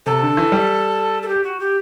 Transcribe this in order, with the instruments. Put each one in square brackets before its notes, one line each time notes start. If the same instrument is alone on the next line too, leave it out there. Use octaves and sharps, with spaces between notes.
[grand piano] C3 [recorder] A4
[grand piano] D3
E3
G3
[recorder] A4
G4
F#4
G4